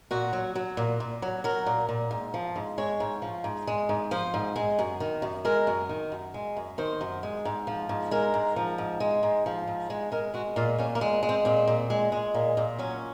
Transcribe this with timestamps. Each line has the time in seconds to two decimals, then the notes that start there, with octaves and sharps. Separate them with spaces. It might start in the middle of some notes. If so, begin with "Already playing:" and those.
0.11 A#2 F#4
0.33 F#3
0.55 F#3
0.77 A#2
1.00 A#2
1.22 F#3
1.44 F#3 A#4
1.66 A#2
1.89 A#2
2.11 G#2
2.34 F3
2.56 G#2
2.78 G#3 C#5
3.00 G#2
3.22 F3
3.44 G#2
3.67 G#3
3.89 G#2
4.11 F3 C5
4.34 G#2
4.56 G#3
4.79 F#2
5.00 D#3
5.22 F#2
5.45 G#3 A#4
5.67 F#2
5.89 D#3
6.12 F#2
6.34 G#3
6.57 F#2
6.78 D#3 C5
7.01 F#2
7.23 G#3
7.45 G#2
7.67 F3
7.89 G#2
8.11 G#3 A#4
8.34 G#2
8.56 F3
8.78 G#2
9.00 G#3
9.23 G#2
9.46 F3
9.67 G#2
9.90 G#3
10.12 G#3 A#4
10.34 G#3 F#4
10.56 A#2 F4
10.78 A#2 C#4
10.95 A#3
11.01 G#3
11.23 G#3
11.29 C4
11.45 A#2 C4
11.67 A#2
11.90 G#3
12.12 G#3
12.34 A#2
12.57 A#2
12.79 F#3 C#4